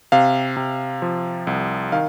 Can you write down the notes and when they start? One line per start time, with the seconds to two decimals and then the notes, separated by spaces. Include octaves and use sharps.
0.12 C3 F5
0.57 C3
1.02 F3
1.47 C2
1.92 D#3 F5